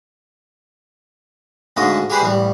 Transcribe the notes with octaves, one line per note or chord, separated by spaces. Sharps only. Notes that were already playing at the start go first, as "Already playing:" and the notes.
D2 G#2 C#3 G#3 D#6
G4 G#4 B4 C5 D5
A1 G3